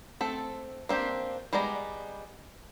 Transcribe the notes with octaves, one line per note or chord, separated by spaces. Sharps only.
A3 C4 A4
A#3 C4 D4 G4
G3 G#3 B3 D5 A#5